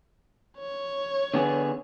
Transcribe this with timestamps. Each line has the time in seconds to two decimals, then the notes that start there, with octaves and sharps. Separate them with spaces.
0.58 C#5
1.34 D3 B3 G#4